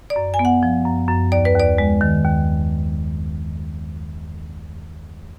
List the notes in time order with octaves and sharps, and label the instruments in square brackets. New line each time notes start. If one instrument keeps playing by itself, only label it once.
[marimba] D5
F#2
G#5
B3
F#5
F3
F#2
F#2
D#2 D5
B4
D#2
D5
G#3
D#3
D#2